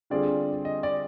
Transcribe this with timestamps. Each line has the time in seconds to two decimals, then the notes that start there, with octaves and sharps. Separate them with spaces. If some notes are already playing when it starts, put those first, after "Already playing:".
0.10 D3 G3 C4 F4 G#4 D5
0.65 D#5
0.83 D5